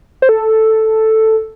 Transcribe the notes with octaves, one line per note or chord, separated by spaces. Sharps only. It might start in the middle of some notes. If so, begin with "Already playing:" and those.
C5
A4